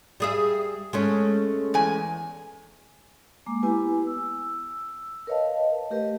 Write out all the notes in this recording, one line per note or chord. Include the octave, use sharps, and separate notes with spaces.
G3 G#4 E5
G#3 A3 C#4
E2 G#5
G#3 A#3 D6
B3 E4 G4 B4 G#5
E6
A#4 B4 C#5 D#5 F5 A5
A3 G4 A#4 B4 D#5